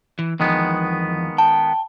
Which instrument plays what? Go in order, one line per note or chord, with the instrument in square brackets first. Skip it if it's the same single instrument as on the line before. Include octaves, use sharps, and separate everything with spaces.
[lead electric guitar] E3
[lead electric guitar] E2 F3 [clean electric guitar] D#3 G#3 B3
[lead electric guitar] G5 [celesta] A5